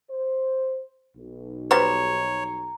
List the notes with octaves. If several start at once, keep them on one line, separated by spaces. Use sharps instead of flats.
C5
B1
G3 B3 C5 C#5 A#5